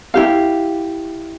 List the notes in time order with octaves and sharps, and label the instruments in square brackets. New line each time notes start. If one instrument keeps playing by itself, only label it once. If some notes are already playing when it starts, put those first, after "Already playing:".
[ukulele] E4 G4 F5